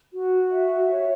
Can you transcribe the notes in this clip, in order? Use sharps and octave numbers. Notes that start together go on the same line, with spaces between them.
F#4
E5
C#5